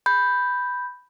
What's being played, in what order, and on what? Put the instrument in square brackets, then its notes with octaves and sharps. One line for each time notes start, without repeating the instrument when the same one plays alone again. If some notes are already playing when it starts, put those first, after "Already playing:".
[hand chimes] B5 G6